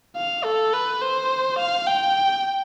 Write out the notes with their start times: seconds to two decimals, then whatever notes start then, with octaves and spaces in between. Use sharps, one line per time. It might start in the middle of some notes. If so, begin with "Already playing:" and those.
0.16 F5
0.45 A4
0.74 B4
1.02 C5
1.59 F5
1.87 G5